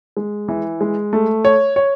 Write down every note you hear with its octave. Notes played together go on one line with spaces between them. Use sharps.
G#3
E3
G#3
A3
C#5
C#5